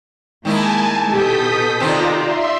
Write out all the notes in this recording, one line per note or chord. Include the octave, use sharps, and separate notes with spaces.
D#3 G#3 A#3 D#4 E4 G#5 A5
B2 G4 A4 D#6 G6 B6
C3 D#3 C4 D#4 F4 D5 A#5
E5 C6